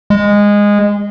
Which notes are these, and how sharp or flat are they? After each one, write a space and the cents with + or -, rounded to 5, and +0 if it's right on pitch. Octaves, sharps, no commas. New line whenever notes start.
G#3 -15